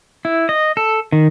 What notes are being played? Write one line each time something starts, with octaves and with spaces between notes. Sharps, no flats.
E4
D#5
A4
D#3